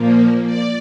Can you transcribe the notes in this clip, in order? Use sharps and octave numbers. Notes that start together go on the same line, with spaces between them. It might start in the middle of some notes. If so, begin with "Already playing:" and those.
Already playing: A#2 F3 A#3
D5